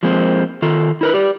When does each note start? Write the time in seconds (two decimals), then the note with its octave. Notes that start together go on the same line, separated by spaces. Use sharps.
0.03 F3 G#3 A#3 C4
0.62 D#3 F4 A4
1.01 E4 A#4 B4
1.14 G4 D5